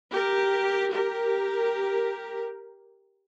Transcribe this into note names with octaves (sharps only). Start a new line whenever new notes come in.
G4 A#4
G4 A#4